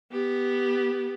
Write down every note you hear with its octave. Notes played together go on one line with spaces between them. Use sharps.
B3 G4